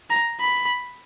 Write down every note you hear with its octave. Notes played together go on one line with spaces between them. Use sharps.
A#5
B5